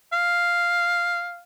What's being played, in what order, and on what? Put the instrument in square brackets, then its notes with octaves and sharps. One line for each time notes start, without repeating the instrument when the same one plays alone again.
[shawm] F5